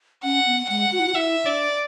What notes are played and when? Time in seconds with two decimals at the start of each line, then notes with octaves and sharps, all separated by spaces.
0.23 C#4 F#5
0.47 B3
0.69 G#3 F#5
0.92 F#4
0.99 E4
1.07 F#4
1.15 E4 E5
1.45 D4 D5